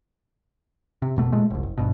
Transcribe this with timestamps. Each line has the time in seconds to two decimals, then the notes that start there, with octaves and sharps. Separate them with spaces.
1.02 C3
1.16 F1 B2 A3
1.32 A#2 G#3 A3
1.50 F1 C2
1.63 F#1
1.78 G#1 G2 B2